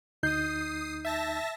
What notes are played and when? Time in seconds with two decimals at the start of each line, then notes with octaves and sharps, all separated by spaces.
0.23 D2 D#4 D#6 G6 C7
1.05 E5 A5 A#6